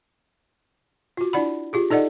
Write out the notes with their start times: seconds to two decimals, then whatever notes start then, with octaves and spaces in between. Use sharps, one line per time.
1.17 F4 F#4
1.33 D4 E4 D5 F#5 B5
1.73 F4 G4 G#4
1.90 D#4 A4 D5 D#5 F#5